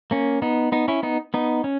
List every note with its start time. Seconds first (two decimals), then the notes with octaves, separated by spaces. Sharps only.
0.11 A#3 C#4
0.42 B3 D#4
0.72 B3 D#4
0.88 C#4 E4
1.03 B3 D#4
1.34 B3 D#4
1.64 C#4